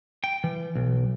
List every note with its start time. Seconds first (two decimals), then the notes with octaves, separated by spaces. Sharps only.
0.24 G5
0.44 E3
0.75 B1